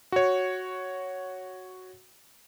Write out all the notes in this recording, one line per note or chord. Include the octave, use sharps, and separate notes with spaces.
F#4 C#5